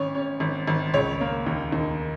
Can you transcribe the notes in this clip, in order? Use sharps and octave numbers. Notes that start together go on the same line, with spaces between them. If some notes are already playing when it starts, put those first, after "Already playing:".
Already playing: G#1 C#4 C#5
C#4
G#1
G#1
C#2 C#5
A#3
D#2
D#2